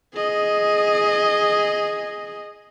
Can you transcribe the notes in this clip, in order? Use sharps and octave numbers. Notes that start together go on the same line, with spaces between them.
G#4 D#5